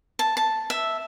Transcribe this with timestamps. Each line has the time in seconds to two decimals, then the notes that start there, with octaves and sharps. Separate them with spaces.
0.19 A5
0.37 A5
0.70 E5